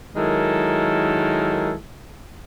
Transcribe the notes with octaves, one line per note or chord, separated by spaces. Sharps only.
D#3 F#3 G#3 E4 A4 A#4